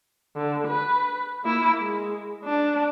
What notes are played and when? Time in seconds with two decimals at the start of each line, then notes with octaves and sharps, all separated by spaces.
0.36 D3
0.67 B4
1.44 A#3 E4
1.80 G#3
2.44 D4